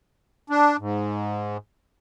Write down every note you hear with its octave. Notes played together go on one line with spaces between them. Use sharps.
D4
G#2